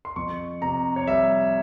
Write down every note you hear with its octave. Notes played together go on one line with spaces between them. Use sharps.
C6
F2 C#6
C3 A#5
C#5
G3 E5